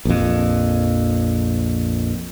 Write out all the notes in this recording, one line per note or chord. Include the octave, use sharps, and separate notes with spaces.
A#1 F2